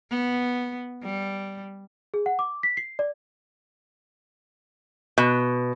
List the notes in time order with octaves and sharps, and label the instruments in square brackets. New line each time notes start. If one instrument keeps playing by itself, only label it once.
[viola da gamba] B3
G3
[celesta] G#4
F#5
D6
B6
C7
D5
[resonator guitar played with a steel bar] B2